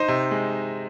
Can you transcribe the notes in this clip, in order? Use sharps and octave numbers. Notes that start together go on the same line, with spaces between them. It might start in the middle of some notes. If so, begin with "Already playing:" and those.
Already playing: D#4 C5
C3
G#3